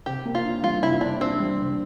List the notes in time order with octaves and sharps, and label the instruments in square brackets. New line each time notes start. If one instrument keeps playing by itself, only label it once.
[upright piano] C3 [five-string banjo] G4
[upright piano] A#3
[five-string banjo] F4
[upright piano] D4
[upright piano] G3 [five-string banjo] F4
[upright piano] C3 [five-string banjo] E4
[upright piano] A#3 [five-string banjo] D4
[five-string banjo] C4 [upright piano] D4
[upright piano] G3
C3